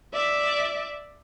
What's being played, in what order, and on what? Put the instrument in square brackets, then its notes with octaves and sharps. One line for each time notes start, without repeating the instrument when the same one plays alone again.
[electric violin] D5 E5